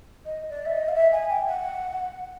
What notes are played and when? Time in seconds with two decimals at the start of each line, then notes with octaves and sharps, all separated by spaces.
0.26 D#5
0.50 D5
0.65 E5
0.72 D#5
0.88 F5
0.95 E5
1.12 G#5
1.29 G5
1.47 F#5